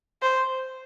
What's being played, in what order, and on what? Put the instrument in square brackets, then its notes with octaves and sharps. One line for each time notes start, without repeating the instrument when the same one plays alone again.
[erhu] C5